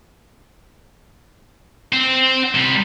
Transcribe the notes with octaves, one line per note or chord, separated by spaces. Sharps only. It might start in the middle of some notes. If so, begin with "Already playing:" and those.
C4
C3 G3